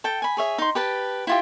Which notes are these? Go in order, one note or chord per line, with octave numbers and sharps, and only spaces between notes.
A4 G5
G#5 B5
G#4 C#5 E5
D#4 C6
G4 B4 A5
E4 F4 G4